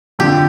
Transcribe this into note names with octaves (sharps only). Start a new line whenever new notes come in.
F2 D3 F3 G4